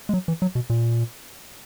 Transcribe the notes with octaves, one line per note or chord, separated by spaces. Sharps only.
G#3
F#3
E3
F#3
B2
A#2